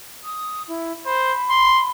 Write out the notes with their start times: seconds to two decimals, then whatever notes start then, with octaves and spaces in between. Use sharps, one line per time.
0.24 D#6
0.68 E4
1.06 C5 B5
1.50 C6